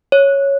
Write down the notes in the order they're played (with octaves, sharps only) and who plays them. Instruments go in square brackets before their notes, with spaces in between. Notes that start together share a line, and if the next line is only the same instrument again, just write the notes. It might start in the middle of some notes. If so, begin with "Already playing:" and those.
[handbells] C#5